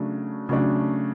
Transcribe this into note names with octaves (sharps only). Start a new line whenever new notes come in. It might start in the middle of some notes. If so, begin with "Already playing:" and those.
Already playing: C#3 F#3 A3 D4
C#3 F#3 A3 D4